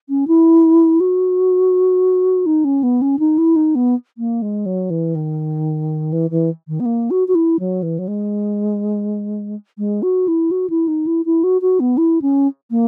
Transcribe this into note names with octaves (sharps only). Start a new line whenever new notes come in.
C#4
E4
F#4
D#4
C#4
B3
C#4
D#4
E4
D#4
B3
A#3
G#3
F#3
E3
D#3
E3
E3
D#3
B3
A#3
F#4
F#4
E4
F#3
E3
F#3
G#3
G#3
F#4
E4
F#4
E4
D#4
E4
E4
F#4
F#4
B3
E4
C#4
A#3